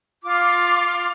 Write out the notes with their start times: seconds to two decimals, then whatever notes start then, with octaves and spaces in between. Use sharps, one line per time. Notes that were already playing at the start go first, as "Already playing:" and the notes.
0.23 F4 D6